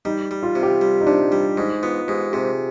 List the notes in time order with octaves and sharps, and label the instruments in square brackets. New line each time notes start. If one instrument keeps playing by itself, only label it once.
[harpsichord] G3 [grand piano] D#4
[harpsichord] G3
[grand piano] F4
[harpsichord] C3
[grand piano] G4
[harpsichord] G3
[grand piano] D#4
[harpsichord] C3 [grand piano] D4
[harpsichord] G3
[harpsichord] G#2 [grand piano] D#4
[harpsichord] B3 [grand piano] F4
[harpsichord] G#2 [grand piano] G4
[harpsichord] C3 [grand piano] G#4